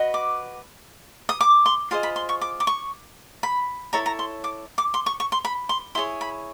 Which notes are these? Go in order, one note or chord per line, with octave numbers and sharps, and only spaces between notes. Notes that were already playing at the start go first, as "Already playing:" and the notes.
Already playing: F#4 B4 D#5
D6
D#6
D6
C6
F4 G#4 C5 D#5 C6
B5
C6
C#6
D6
D6
C#6
B5
E4 A4 C#5 A#5
A#5
C6
D6
D6
C6
C#6
C#6
C6
B5
C6
E4 G#4 C#5 C6
B5